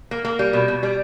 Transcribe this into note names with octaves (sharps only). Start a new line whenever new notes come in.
A#3
A#3
G3
B2
B2
G3